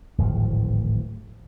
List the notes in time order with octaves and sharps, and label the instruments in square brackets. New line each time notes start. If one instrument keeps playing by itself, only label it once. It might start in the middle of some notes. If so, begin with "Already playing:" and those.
[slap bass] D1 G#1 A2 F3